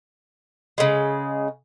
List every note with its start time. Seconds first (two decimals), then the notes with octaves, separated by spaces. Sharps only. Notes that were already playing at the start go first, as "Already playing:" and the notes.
0.78 C#3 G#3